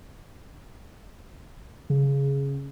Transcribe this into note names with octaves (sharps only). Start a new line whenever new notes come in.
C#3